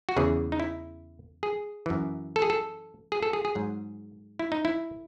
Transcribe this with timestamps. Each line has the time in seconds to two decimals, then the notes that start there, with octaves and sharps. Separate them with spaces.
0.09 F#4
0.16 E2 C#3 E3 G#4
0.52 D#4
0.60 E4
1.43 G#4
1.86 F#2 E3
2.36 A4
2.42 G#4
2.50 A4
3.12 G#4
3.23 A4
3.33 G#4
3.45 G#4
3.55 G#2 F#3
4.39 E4
4.52 D#4
4.65 E4